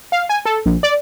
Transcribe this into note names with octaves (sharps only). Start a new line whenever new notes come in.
F5
G#5
A4
A#1
D5